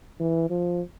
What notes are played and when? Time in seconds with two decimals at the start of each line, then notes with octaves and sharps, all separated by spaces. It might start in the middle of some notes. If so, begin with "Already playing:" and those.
0.20 E3
0.50 F3